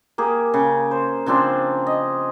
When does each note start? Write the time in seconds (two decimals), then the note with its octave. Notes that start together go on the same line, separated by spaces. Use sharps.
0.18 A#3 G4 G#4
0.54 C#3
0.91 C5
1.26 C#3 F3 C4 D4
1.87 D#5